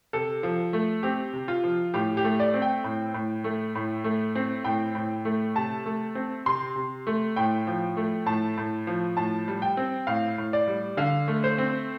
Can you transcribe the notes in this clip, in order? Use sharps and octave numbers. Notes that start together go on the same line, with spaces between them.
C3 A4
F3
A3
C4 G4
C3
F4
F3
A2 G4
G4
A3
D5
C4
G5
A2
A2
A3
A2
A3
C4
A2 G5
A2
A3
C3 A5
A3
C4
C3 C6
C3
A3
A2 G5
F3
A3
A2 A5
A2
F3
A2 A5
G3
G5
C4
A2 F5
A2
D5
G3
D3 F5
A3
C5
C4